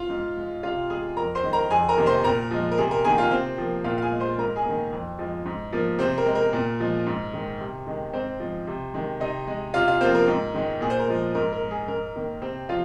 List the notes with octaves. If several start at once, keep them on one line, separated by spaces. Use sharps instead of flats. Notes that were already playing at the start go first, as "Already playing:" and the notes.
Already playing: F4 F5
G#2
G#3
C3 F4 F5
G#3 G#4 G#5
F2 A#4 A#5
C5 C6
D#3 G#3
A#4 A#5
F2 G#4 G#5
A#4 A#5
C3 D#3 A#3
C5 C6
A#2 A#4 A#5
F3 G#3
A#4
C3 G#4
A#4
D#3 A#3 G#4 G#5
F4 F5
C3 C4 C5
F3 A#3
A#2 F4 F5
F5
G#4 G#5
G#3
C5 C6
G#2 A#4 A#5
G#4 G#5
D#3 A#3
F2
F3 G#3
G#2
F3 A#3
C3 C4 C5
A#4
G#3
A#4
A#2
F3 G#3
G#2
D#3 G#3
C3
D#3 G#3
G#2 C4 C5
F3 G#3
C3
D#3 G#3
C3 D#4 D#5
G#3
C3 F4 F5
F4 F5
F3 A#3 C4 C5
A#4
G#2
D#3 G#3
A#2 G#4
C5
A#4
F3 G#3
G#2 A#4
A#4
G#3
G#4
G#2 A#4
D#3 A#3
C3 C4 C5
F3 F4 F5